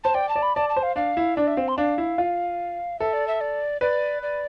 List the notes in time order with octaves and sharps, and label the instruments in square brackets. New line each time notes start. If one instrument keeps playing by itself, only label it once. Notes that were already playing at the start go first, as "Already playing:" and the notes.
[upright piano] C5 [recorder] A5
[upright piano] D5 [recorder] G5
[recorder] A5
[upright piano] D5
[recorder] B5
[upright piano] D5 [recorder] A5
[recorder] A5
[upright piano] C5
[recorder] F5
[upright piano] D4 [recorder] F5
[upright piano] E4
[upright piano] D4 [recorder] D5
[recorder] E5
[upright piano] C4 [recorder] F5
[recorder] C6
[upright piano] D4 [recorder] F5
[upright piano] E4
F4
[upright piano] A4 [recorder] E5
[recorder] D5
E5
D5
[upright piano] B4 [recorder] D5
[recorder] D5